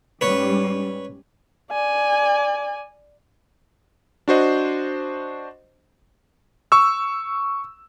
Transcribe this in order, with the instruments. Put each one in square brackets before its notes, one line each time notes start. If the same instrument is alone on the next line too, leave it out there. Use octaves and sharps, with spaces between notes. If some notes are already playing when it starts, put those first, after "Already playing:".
[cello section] G#2 G3 C#4 [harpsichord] B4 C#5
[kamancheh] D5 G#5
[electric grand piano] D4 F#4 C5 D#5
C#6 E6